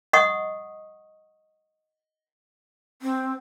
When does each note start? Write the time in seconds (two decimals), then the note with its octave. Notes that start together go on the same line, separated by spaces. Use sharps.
0.13 D#5 F#5 C#6 D#6
3.02 C4